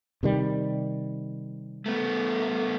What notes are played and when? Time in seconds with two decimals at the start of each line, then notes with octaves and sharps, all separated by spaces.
0.23 C3 D#3 G3
1.86 A3 B3